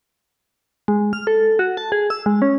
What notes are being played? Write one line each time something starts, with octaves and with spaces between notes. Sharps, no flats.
G#3
F6
A4
F#4
A5
G#4
E6
G#3
C#4